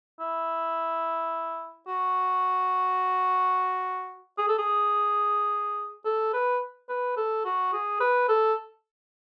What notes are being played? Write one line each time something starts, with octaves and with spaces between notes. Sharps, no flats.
E4
F#4
G#4
A4
G#4
A4
B4
B4
A4
F#4
G#4
B4
A4